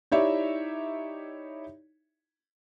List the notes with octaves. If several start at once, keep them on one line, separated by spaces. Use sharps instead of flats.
D#4 E4 G4 C#5 D5 E5